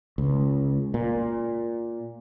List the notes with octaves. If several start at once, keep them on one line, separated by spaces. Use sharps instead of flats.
C#2
A#2